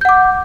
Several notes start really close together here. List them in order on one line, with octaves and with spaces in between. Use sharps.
G6 F#5 D6